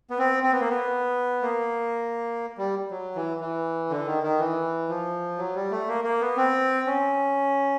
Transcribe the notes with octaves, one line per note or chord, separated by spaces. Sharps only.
B3
C4
C4
B3
A#3
B3
A#3
G3
F#3
E3
E3
D3
D#3
D#3
E3
F3
F#3
G3
A3
A#3
A#3
B3
C4
C#4